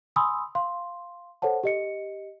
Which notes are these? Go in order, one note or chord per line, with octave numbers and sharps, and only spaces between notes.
G#5 B5 C6 D#6 E6
F5 C6
A4 C5 C#5 F#5 A5
G4 D#5 C#7